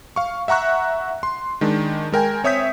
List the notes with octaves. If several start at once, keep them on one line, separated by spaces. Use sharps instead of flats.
F5 C#6
E5 F#5 A#5 C#6 F#6
C6
D#3 G#3 D4
G#3 A#4 G5 G#5
C4 C#5 E5 D#6 G6 B6